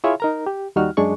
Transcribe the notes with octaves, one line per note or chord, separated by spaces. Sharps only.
E4 F4 G#4 C#5 E5
D#4 A#4 A#5
G4
D#2 G3 D#4 F#4 F6
F#2 G#3 D4 G#4 C#6